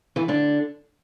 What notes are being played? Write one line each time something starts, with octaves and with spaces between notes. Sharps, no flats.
E3 E4
D3 D4